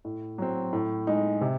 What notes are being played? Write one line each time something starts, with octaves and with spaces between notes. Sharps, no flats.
A2
F#3 C4
A2
G#3 D#4
C3